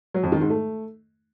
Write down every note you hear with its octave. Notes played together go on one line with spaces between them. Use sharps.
F#3
F2
D#3
G#2
A3